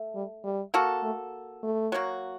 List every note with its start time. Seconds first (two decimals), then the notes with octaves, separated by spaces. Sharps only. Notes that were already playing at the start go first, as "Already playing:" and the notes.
Already playing: A3
0.15 G3
0.44 G3
0.74 A#3 F#4 A4
1.03 A3
1.63 A3
1.92 F#3 A#3 F#4